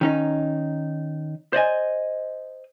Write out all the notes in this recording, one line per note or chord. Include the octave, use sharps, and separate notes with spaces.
D#3 C#4 D#4
C5 D5 D#5 G#5